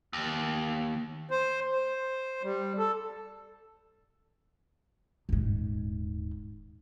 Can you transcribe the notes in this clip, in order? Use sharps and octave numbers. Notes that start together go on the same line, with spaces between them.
D#2
C5
C5
G3
A4
D#1 G#2